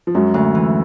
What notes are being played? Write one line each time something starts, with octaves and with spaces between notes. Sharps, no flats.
F3
F#2 F#3 G#3
D2
E3